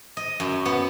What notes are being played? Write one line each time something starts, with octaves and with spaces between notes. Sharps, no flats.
D#5
F#2
B3